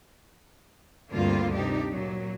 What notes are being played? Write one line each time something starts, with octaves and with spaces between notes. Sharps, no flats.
D2 G2 D3 A#3 C4 F4
C3 D4 D#4 G4
A#2 F#3